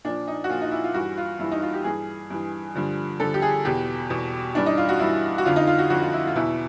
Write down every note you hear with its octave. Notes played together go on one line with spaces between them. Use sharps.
A#2 F3 D4
D#4
F#4
A#2 F3 F4
D#4
E4
F4
G2 E3 F#4
F4
G2 E3 E4
D#4
F4
G4
G2 E3 G#4
G2 E3
G2 D3 F3
G2 D3 F3 A4
G4
G#4
E2 B2 G4
E2 B2
G2 E3 D4
D#4
F4
F#4
G2 E3 E4
F#4
F2 D3 F3 F4
D#4
F4
F#4
F2 D3 F3 F#4
F4
E4
F4
E2 B2 E4